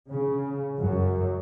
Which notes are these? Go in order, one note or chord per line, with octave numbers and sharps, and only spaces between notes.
C#3
F#2